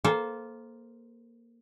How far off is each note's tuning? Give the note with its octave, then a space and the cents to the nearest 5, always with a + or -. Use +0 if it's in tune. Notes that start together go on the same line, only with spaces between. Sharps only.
A#3 +0 A4 -25 C5 +0